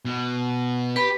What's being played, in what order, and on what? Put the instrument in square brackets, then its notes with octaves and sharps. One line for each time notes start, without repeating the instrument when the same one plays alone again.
[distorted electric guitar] B2
[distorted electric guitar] G4 [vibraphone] B4 B5